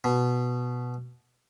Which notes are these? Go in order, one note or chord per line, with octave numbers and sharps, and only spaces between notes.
B2